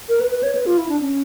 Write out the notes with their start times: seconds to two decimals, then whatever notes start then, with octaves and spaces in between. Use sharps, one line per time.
0.09 A#4
0.20 B4
0.31 B4
0.43 C#5
0.55 B4
0.66 F4
0.78 E4
0.89 D4
1.01 C#4